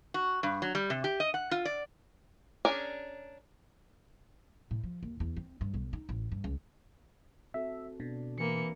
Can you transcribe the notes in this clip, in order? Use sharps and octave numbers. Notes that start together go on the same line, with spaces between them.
F#4
G2
F#3
G3
C3
G4
D#5
F#5
F4
D5
C#4 D4 G#4 A#4 D5
A2
F3
D#2
E2
C4
G2
B1
D#4
A1
G2
C#2
C4 F#4 A4 E5
B2 D4
E3 A#3 C#7